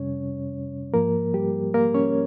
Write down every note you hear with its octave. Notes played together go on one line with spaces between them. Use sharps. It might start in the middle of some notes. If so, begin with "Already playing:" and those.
Already playing: F2 C3 G3 C#4 C#5
G#2 F3 A#3 A#4
G3 G4
A#3 A#4
C#4 C#5